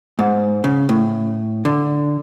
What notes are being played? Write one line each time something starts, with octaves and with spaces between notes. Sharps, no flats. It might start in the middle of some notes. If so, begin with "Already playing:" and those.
G#2
C#3
A2
D3